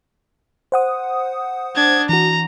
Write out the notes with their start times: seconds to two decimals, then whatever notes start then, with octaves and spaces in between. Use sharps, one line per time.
0.72 C5 F#5 D#6
1.75 D4 G#6
2.09 E3 F#4 A#5